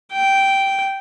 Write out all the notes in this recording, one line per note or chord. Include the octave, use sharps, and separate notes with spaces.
G5